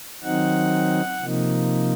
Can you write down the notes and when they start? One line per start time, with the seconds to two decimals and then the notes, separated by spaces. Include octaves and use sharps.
0.24 D#3 F#3 C4 D#4 F#5
1.21 C3 F3 A#3 D#4